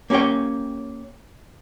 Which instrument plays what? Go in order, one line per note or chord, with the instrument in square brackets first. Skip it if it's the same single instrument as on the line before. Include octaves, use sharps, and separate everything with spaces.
[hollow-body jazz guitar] A#3 C#4 G4 C#5 G5